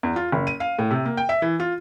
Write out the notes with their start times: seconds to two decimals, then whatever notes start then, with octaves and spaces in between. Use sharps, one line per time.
0.03 E2
0.16 F4
0.32 F#1
0.47 D#7
0.60 F5
0.79 A2
0.91 C3
1.05 A#3
1.17 G5
1.29 E5
1.42 E3
1.60 F4